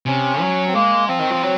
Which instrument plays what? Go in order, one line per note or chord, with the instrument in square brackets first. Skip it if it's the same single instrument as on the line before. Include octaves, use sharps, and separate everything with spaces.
[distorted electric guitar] C3 [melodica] C#4
[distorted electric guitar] F#3
[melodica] C4
[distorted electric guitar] G#3 [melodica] A#3
[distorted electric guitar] F3 [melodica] C4
[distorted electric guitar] D#3
F3
F#3